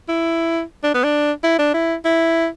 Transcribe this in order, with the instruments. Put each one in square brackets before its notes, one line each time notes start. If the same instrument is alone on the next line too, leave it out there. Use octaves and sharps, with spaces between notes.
[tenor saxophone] E4
D4
B3
D4
E4
D4
E4
E4